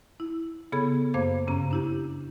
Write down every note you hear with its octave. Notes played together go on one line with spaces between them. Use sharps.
E4
C#3 B3 G#4 A4 B5 G#6
F#2 A#3 C5 F5 D6 G#6
G2 C#3 C#4 A#5
D4 E4 G4